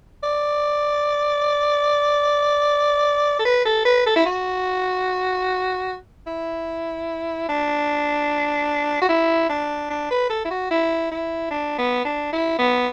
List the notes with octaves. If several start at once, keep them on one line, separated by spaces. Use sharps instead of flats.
D5
A4
B4
A4
B4
A4
E4
F#4
E4
D4
F#4
E4
D4
D4
B4
A4
E4
F#4
E4
E4
D4
B3
D4
E4
B3